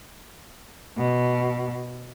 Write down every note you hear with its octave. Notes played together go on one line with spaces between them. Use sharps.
B2